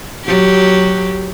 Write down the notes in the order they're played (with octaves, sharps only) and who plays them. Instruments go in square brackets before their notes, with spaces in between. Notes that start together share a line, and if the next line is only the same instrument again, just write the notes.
[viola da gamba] F#3 G4